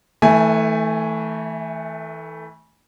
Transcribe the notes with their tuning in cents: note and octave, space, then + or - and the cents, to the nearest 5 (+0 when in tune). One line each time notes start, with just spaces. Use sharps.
E3 -30 A3 +0 G#5 +0